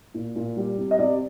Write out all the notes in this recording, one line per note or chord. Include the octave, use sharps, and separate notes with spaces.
A#2
A#2
G3
C3
D#5
C3 D5